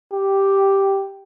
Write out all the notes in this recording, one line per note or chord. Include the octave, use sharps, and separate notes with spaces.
G4